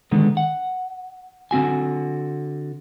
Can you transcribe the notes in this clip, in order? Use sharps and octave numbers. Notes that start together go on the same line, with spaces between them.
D3 D#3 G#3 B3
F#5
D3 C4 F#4 G#5